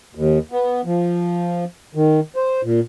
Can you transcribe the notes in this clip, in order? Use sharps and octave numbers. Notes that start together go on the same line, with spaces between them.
D#2
B3
F3
D#3
C5
A#2